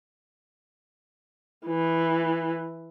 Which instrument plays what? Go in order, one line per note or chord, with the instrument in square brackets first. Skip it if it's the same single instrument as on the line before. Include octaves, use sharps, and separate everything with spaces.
[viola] E3